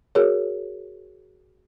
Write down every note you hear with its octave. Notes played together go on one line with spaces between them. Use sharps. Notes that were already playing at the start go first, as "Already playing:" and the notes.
F#4 G#4 A#4 C#5